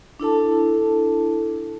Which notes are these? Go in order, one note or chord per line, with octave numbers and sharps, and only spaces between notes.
D4 E4 A4 A5